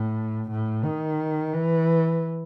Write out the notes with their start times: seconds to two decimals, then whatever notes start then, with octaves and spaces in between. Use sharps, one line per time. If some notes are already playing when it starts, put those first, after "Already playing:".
Already playing: A2
0.51 A2
0.85 D#3
1.53 E3